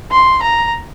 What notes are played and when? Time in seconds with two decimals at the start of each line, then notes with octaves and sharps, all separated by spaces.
0.11 C6
0.42 A#5